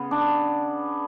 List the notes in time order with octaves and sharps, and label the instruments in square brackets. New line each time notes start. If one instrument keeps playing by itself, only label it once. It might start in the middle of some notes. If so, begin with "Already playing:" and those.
Already playing: [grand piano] C#3 [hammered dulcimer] B3
[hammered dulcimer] D4